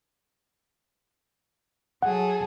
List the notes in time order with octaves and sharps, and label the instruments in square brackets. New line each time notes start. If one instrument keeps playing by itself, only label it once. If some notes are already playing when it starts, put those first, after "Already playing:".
[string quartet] F#3 G#4 A4 [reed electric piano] F#5